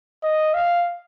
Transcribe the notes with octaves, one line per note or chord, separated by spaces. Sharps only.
D#5
F5